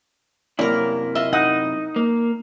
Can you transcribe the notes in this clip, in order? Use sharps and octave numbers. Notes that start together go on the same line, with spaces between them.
F#2 C3 F#3 A#3 E4 A#4 C#5 D5
F4 D#5 E5 C6
D#4 F#5
A#3